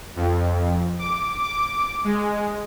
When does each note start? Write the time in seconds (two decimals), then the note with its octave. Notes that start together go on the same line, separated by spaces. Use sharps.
0.16 F2
0.99 D6
1.42 D6
2.04 G#3